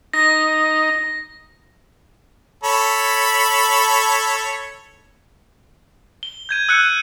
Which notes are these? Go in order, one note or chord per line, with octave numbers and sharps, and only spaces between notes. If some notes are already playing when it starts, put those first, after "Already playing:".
D#4 A#6
A4 C#5 B5
G7
G6 G#6 D#7
E6 F#6 G6 C#7 D#7